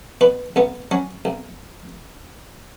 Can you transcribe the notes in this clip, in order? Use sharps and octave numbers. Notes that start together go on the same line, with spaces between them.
B2 B4
B1 B3
F#3 C#4
B1